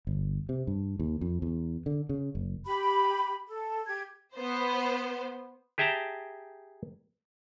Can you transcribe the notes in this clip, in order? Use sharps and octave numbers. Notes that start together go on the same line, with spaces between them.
G1
C3
G2
D#2
F2
E2
D3
C#3
F#1
G4 B5
A4
G4 G#6
B3 C5
G4 G#4 E5 G5 A5 A#5